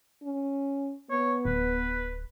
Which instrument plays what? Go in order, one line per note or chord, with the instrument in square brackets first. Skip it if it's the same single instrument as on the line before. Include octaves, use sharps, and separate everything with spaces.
[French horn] C#4
[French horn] B3 [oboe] C#5
[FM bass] D1 [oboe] B4